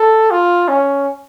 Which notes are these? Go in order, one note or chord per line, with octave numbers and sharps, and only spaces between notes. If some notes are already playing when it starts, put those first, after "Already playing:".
Already playing: A4
F4
C#4